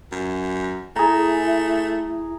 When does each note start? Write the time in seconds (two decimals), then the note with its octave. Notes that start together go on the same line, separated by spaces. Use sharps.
0.12 F#2
0.96 A3 E4 G#4 A#5